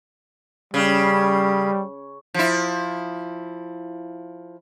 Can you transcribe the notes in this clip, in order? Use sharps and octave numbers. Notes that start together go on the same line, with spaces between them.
C#3 G3
F3 E4